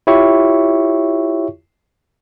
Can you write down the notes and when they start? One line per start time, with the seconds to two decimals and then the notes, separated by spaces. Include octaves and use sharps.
0.07 E4 F4 G4 C#5 E5 C#6